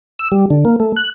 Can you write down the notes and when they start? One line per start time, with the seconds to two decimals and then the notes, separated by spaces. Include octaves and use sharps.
0.19 E6
0.32 G3
0.50 D3
0.65 A#3
0.80 A3
0.96 F#6